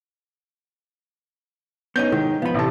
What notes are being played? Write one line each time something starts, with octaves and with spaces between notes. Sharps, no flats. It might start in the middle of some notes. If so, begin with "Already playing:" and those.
B3 C#4 D#4 G6
G#2 D#3
F3 B3 B5
A1 C3 A5